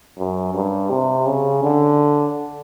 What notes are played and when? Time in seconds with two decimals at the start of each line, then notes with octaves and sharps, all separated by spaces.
0.18 F#2
0.54 G2
0.90 C3
1.26 C#3
1.64 D3